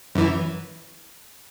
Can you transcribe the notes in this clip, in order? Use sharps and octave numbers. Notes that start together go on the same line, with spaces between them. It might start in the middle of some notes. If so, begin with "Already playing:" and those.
F#2 E3